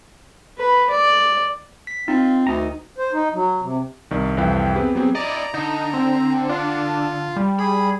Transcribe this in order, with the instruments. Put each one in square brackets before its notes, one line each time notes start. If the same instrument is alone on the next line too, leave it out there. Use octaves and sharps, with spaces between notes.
[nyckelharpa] B4
D5
[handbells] B6
[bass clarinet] C4 [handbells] D#4 [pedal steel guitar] F4
[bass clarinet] D2 [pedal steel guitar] D#3 D#5 A#5
[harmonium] C5
D#4
F#3
C3
[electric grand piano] C2 D#3 D5
C2 F2 E3 F5 G5
B3 C4 G4 G#4 B4
F#3 B3 C4 G4 G#4
[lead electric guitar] E4 D#5 [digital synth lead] D5 [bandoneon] A#5
[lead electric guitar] D3 [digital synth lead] D#4
[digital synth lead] C4
[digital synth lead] D4 [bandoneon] F4
[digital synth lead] G3
[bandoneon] G#4 [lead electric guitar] B5